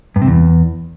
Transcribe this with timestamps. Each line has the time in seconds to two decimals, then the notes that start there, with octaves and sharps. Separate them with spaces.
0.16 G2
0.22 C3
0.27 E2